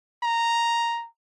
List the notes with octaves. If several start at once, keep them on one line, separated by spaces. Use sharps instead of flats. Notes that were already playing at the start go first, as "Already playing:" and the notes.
A#5